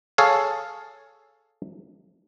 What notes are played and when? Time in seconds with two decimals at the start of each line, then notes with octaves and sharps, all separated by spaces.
0.18 G#4 A4 C#5 F5